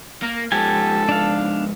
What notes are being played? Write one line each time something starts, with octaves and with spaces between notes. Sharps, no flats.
A#3 A#4
G#2 F3 G4 A4 G#5
D4 F5